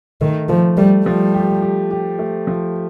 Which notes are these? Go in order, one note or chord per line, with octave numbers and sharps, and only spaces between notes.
D#3 A3
F3 A3
G3 A3
F3 G3
G4
G4
G4
A3
F3